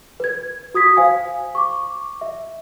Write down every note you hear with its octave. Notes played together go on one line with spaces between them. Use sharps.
B4 G#6
F#4 D#6 G#6 B6
C5 F5 G#5
C#6 D6
E5